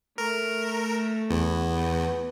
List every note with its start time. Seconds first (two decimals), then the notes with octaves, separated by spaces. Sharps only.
0.18 A3 A#4
1.31 E2 B3